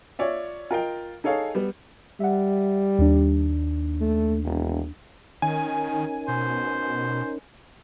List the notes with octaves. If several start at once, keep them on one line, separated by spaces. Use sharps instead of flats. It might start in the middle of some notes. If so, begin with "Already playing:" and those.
F4 C#5 D5 E5
F4 A#4 D#5 G5
D#4 G#4 A4 C#5 F5
G3 B3
G3 E5 F#5
D#2 D4
A3
E1
D#3 C#4 D#4 A#4 G#5
B2 C5